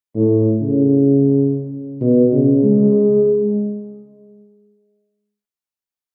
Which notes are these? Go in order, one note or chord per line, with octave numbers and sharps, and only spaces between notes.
A2
C#3
B2
C#3
G#3